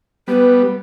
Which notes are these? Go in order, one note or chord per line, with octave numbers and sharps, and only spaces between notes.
G3 B3 B4